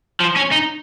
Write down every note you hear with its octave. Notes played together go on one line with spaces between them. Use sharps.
F3
C#4
D#4